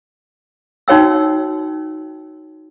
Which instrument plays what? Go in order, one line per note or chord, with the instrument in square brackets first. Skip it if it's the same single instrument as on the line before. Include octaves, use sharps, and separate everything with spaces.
[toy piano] D#4 F#4 C#5 G5 E6